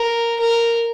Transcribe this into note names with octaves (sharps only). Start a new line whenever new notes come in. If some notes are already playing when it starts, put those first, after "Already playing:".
Already playing: A#4
A#4